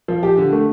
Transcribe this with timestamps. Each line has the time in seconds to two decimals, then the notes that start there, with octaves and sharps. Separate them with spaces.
0.08 F3
0.23 G4
0.38 D3
0.52 A3